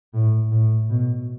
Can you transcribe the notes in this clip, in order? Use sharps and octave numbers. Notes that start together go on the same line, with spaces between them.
A2
A2
B2